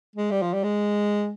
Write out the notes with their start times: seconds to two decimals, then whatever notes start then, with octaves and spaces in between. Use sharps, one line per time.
0.16 G#3
0.31 G3
0.42 F3
0.53 G3
0.64 G#3